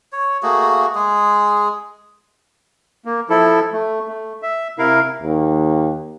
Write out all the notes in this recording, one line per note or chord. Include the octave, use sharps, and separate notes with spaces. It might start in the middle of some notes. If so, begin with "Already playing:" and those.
C#5
A3 A#3 F#4 G#4
G#3 G#4
A#3
F3 E4 A4
A3
A3
E5
C3 E4 A#4 F5
D#2